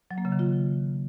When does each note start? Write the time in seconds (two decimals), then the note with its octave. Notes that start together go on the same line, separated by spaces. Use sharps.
0.11 F#3
0.18 A#3
0.25 C#3
0.32 D#3
0.39 F4